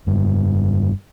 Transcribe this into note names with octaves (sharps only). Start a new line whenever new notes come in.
F1 G2